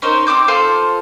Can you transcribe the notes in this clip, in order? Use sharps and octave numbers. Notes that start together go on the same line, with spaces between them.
C#4 D#4 A#4 C5
C4 A#4 D6 G6
F4 A4 C5 F5